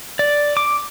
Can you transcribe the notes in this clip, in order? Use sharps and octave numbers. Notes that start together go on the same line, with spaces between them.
D5
D6